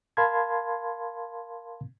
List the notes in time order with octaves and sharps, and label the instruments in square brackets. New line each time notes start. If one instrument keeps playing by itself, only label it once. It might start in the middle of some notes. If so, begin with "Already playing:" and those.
[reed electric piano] A#4 F5 A5 B5 C6 G#6